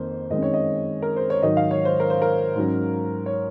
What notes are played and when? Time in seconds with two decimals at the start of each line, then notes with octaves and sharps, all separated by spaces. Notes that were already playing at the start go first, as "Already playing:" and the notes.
Already playing: F2 D#3 A#3 C5
0.30 F#2 D#3 G#3 C4 D#5
0.42 C#5
0.54 D#5
1.02 A#4
1.16 C5
1.30 C#5
1.43 G#2 D#3 F#3 D#5
1.57 F5
1.71 C#5
1.85 C5
2.00 A#4
2.10 C5
2.22 A#4
2.55 G#2 F#3 C#4
3.26 C#5